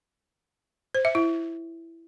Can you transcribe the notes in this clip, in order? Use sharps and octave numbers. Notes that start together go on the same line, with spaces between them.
C5
E5
E4